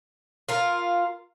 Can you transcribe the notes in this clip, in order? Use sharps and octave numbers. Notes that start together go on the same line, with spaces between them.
F4 A#4